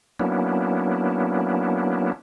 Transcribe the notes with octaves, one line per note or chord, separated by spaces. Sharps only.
F#3 A#3 B3 C#4 D4 E4